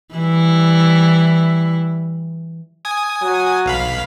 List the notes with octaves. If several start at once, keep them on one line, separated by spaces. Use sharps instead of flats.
E3 G3 E4
G#5 D#6
F#3
B1 F5 B5